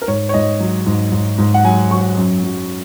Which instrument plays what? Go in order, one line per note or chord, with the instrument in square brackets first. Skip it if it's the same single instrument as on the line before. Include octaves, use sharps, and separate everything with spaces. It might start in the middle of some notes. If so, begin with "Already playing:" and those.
[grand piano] A#4
G#2 C#5
C#5
G#2 D#5
F#3
G#2
G#2
G#2
F#5
F#3 G#5
F#3 C#6
F#2
F#3